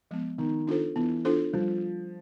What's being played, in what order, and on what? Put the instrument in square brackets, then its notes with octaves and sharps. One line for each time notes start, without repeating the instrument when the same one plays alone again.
[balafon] F3 G#3 B3
[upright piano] D#3 [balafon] B3
[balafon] D4 F4 A4 C5
[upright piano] E3 [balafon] B3
[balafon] D4 F4 A4 C5
[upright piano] F3 [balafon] G3